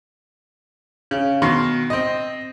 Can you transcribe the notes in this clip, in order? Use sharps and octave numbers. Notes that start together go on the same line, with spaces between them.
C#3
B2 D#3 C6 C#6
C4 D#5